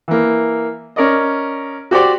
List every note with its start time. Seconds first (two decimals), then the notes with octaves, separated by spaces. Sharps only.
0.08 E3 A#3
0.96 C#4 A#4 D5 D#5
1.91 F#4 G4 C5 D5